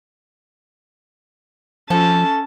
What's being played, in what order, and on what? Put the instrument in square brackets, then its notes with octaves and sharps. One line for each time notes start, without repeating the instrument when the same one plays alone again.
[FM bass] F3 [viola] C#4 A5 [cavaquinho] A4